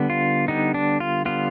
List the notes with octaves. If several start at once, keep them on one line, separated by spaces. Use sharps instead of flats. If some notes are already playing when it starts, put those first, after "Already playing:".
Already playing: D3 G3 B3
F4
D3 G3 B3 D#4
D4
F4
D3 G3 B3 F4